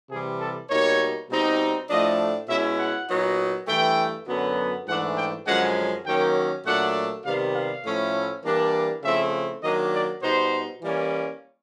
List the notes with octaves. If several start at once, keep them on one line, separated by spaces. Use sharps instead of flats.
C3 E3 G3 G#4
A4
B2 G3 A#3 D#4 C#5
B2 G3 C4 D#4
A2 F3 A3 D4 D#5
B2 G#3 C#4 E4 E5
F#5
A#2 F#3 B3 D#4
G2 E3 A3 G5
F#2 D3 F#3 B3
G#2 E3 A3 D4 F#5
G5
F#2 D3 F3 G#3 C#4 F#5
D#3 F#3 A#3 C#4 G5
A#2 F#3 A3 D4 F#5
C3 D#3 G3 B3 F5
F5
A2 F3 A3 C#4 E4
E3 G3 A#3 D4
C#3 F3 A3 C4 E4 E5
D#3 F#3 A#3 D4 D#5
D5
B2 G3 B3 D#4 C5
E3 G3 A#3 C#4